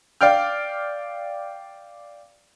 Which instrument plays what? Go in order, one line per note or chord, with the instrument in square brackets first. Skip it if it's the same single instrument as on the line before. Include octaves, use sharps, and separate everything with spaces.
[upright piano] D5 F5 G5 F6